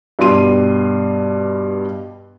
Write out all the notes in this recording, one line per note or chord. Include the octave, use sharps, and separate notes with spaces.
G2 B2 G3 C6 D#7